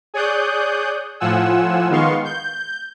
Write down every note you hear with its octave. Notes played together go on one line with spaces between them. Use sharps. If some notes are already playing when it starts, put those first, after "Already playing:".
G#4 C#5 D5 D#6 F#6 G6
A2 F3 F4 F#5 G#5 E6
D#3 G#3 B3 F5 C6 C#6
G6